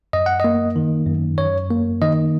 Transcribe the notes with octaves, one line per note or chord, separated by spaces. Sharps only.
F#2 D#5
F#5
A#3 D#5
D#3
F#2
F#2 C#5
A#3
D#3 D#5